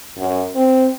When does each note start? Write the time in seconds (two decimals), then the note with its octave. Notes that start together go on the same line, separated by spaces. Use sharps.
0.17 F#2
0.55 C4